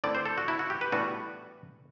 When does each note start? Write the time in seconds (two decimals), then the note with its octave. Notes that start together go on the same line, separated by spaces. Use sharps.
0.04 D3 A3 C4 E4 D5
0.15 C5
0.26 A4
0.38 F#4
0.48 E4
0.59 F#4
0.70 G4
0.81 B4
0.92 A2 E3 G3 B3 D4 F#4